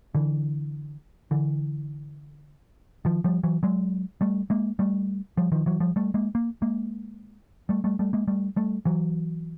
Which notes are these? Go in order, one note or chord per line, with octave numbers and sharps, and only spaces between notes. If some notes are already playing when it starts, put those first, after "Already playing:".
D3 E3
D3 E3
D#3 F3
F3 G3
E3 F#3
F#3 G#3
G3 A3
G#3 A#3
G3 A3
F3 G3
D#3 F3
E3 F#3
F3 G3
G3 A3
G#3 A#3
A#3
G#3 A#3
G3 A3
G3 A3
G3 A3
G#3 A#3
G3 A3
G3 A3
E3 F#3